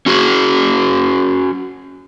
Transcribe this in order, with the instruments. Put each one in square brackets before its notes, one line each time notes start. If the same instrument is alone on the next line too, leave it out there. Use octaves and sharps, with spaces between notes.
[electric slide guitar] C#4 F#4 G#4